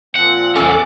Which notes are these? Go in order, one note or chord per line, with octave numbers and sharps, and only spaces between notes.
A#2 F3 C4 F#5
E2 C#4 A4 F#5 G#5 D6 E6 F6